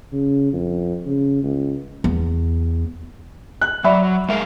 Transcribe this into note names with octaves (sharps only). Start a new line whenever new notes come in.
C#3
F2
C#3
C#2
E2
F#6
F#3 D5 E5 B5
G#3 A#4 E5 F5